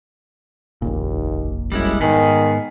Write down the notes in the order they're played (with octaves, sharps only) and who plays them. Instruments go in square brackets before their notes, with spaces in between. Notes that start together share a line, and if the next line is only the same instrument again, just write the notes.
[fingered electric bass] F1 A#1 A#2 [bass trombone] D#2
[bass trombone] F#2 [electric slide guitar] G3 G#3 E4
[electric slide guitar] G#2 B3 G#4 [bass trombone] D#3